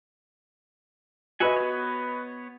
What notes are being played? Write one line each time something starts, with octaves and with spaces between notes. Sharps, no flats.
F#4 B4 D#5 E5 F#5 G#5
B3 C#5